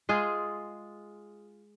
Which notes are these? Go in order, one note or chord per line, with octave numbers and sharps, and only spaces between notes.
G#3 F4 G#4